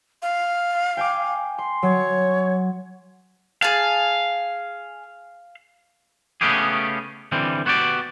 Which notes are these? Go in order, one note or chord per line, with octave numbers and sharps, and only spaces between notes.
F5
G5 G#5 D6
C6
F#3 C#5
G#4 F5 A5
C#3 A3 B3 C#4 G4 G#4
D3 E3 G3 C4
B3 F#4 G4 D5